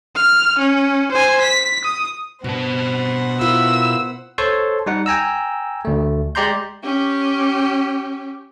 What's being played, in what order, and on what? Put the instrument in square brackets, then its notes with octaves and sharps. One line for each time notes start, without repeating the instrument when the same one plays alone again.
[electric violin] F6
C#4
C5 G#5
B6
D#6
[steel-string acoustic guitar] G2 [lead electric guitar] B2 A5 [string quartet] B3 C5 F#5
[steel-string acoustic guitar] E4 F4 A#4 [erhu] E6
[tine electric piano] A4 C5 C#5 A5 C6
G3 D#4 F#5
G5 G#5 A#5 E6
D2 A3
G#3 G4 D5 A#5 C6 G6
[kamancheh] C#4 G4